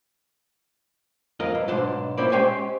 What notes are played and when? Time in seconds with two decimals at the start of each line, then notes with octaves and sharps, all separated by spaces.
1.40 F2 F4 A#4 D#5
1.55 G2
1.68 B1 G#2 D4 C5
2.17 A#2 A#3 C4 C#4 E4 D5
2.32 G#3 C#4 G4 C5 G5 G#5